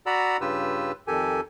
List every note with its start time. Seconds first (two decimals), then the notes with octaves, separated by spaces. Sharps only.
0.06 F#4 D5 F#5 A#5 B5 E6
0.41 G2 C#3 F4 G4 B4 E6
1.07 F2 D#3 G4 A4 G#5